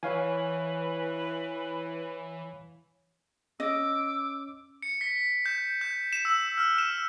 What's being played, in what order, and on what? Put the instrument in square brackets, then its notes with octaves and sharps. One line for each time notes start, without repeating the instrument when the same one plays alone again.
[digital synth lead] E3 [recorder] B4 [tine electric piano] C#5 F5 G#5
[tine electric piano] C#4 [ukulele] D#5 [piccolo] D6 [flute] E6
[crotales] C#7
B6
G6
G6
E7
E6
F6
E7